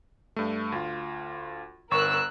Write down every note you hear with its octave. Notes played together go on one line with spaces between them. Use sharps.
G2 A3
D2 F4
G1 A#4 C#6 E6 F#6